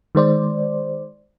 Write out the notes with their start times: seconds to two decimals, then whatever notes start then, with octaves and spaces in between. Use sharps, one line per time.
0.15 D#3 G#3 C5 D5